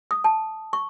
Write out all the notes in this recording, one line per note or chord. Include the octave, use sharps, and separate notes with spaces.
D#6
A5
C#6